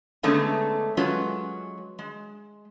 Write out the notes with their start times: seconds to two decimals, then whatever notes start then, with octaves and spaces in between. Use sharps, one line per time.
0.23 D3 G#3 A3 B3 C#4 D#4
0.97 F#3 G#3 C#4 F4 B4
1.99 G#3